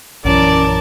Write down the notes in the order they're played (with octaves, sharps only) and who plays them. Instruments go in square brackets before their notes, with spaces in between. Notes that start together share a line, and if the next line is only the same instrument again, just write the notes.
[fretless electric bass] A#1 F#2 E3 [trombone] C#4 [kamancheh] A#4 A5 [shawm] D5